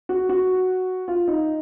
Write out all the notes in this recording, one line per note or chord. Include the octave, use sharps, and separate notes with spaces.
F#4
F#4
F4
D#4